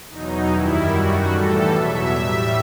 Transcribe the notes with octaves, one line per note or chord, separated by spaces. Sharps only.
E2 B2 F#3 D#4
F#2 D#3 G3 E4
F#2 D#3 G3 F#4
A2 E3 G3 A4
E2 B2 F#3 E5
A2 G3 E5